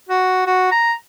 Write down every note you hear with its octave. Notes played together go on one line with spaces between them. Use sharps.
F#4
F#4
A#5